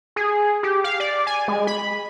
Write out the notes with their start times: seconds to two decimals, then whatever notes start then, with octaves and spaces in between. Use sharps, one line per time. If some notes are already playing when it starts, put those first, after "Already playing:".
0.16 G#4
0.63 G4
0.84 F5
1.00 D5
1.27 G#5
1.48 G#3
1.67 B5